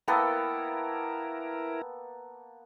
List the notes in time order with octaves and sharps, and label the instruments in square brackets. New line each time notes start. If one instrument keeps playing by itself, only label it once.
[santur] A#3 B3 A4 [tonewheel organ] E4 A#4 [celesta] G5 E6